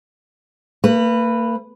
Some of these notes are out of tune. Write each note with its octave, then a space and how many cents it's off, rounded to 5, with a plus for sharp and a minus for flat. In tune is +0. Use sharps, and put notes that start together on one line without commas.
A#3 -40 B4 +0